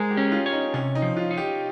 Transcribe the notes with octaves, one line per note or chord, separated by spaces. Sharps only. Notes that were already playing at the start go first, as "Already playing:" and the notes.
Already playing: G#3 G#4 A#4 C5
G4
C#4
F4
C#5
D#4
C3 C#4
D#4
F3
F4
D#4
G4